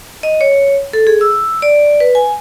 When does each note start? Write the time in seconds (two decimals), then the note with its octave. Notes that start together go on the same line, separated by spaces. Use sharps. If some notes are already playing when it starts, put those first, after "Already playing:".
0.23 D#5
0.41 C#5
0.93 A4
1.07 G#4
1.21 E6
1.62 D5
2.00 B4
2.15 G#5